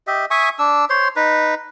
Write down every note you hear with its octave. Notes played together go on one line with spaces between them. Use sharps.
G4 D#5 E5
E5 G#5 C#6 D#6
D4 E6
C5 C#5 C6
D#4 B4